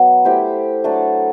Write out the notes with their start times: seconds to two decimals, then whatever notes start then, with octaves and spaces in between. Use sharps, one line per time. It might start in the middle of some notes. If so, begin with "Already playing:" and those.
Already playing: F#3 B3 F#4
0.25 A3 E4 G4 C5
0.84 F#3 A3 D4 A4